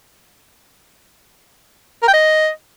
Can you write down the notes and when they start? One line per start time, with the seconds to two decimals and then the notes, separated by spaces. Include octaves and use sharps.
2.02 A#4
2.08 G5
2.13 D#5